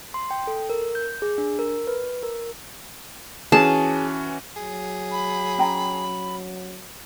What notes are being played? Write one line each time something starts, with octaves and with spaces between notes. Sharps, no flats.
C6
G5
A4
A#4
G6
G#4
D4
A#4
B4
A#4
E3 C#4 F#4 G#4 A5
F#3 G#4
B5
C#4 G5 A#5